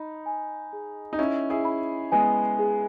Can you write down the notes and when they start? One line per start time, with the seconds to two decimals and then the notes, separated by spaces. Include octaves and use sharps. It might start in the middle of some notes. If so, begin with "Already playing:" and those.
Already playing: D#4 D#5 B5
0.26 G#5
0.73 G#4
1.13 D#4
1.18 C#4 E4 D#5
1.50 E4 G#4
1.65 B5
2.12 G#3 B3 G#5
2.59 G#4